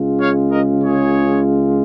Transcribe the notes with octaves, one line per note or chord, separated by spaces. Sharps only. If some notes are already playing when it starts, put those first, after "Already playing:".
Already playing: C#2 C#3 G#3 F4
C#5 F5
A#4 D#5
G#4 C#5